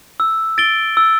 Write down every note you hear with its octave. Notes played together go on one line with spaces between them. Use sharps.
E6
A6 D7 G7
E6